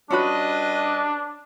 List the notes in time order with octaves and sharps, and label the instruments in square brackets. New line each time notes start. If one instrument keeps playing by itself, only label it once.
[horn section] G3 B4 D#5 [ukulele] C#4 F#4 B5 [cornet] D4